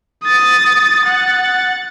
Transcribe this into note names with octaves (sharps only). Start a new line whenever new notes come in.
D#6 A6
F#5 A6